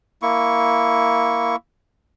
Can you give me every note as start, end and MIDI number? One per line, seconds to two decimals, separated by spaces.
0.22 1.56 58
0.22 1.56 64
0.22 1.56 85